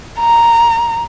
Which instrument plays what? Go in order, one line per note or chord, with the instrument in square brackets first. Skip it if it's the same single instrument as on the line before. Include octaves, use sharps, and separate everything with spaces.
[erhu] A#5